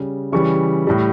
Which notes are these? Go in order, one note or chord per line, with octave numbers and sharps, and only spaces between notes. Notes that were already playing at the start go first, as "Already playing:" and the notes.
Already playing: C#3 G3
C#3 E3 G3 C#6
A2 G3